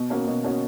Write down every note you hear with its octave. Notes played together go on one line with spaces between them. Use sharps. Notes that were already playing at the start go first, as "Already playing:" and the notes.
Already playing: B2
A#3 C#4 F#4
B2
A#3 C#4 F#4